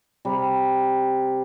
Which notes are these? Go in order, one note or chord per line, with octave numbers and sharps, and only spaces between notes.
C3 G3